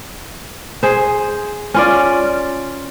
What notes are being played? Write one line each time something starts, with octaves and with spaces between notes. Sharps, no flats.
G#4 C5
C#4 F4 D5